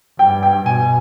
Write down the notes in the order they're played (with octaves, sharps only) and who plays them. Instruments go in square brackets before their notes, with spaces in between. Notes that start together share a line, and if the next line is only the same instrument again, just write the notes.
[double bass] G2 [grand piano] G5
[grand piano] G5
[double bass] B2 [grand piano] G#5